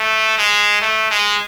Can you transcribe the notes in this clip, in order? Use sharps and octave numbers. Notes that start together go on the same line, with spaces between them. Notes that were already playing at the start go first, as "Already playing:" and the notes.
Already playing: A3
G#3
A3
G#3